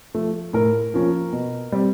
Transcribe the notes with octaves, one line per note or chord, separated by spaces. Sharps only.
F3 A3
A2 A#4
F3 A#3 C#4 F4
B2
G3 C4